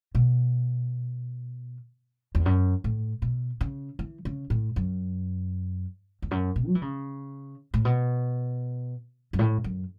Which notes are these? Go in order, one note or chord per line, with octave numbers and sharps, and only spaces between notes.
B2
E2
F#2
A2
B2
C#3
E3
C#3
A2
F#2
E2
F#2
B2
F#3
E3
C#3
A2
B2
F#2
A2
F#2